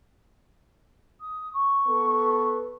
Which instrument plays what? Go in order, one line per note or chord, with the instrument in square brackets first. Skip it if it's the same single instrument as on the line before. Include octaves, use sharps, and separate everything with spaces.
[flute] D#6
C#6
[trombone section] B3 A4 B4